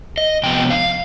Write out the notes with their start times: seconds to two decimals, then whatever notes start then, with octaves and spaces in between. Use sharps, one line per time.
0.18 D#5
0.43 C3 F3 B3 G5
0.70 F5